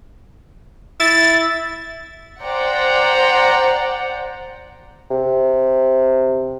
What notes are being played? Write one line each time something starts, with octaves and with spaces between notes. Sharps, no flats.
E4 A6
C5 D5 F#5 G5 A#5
C3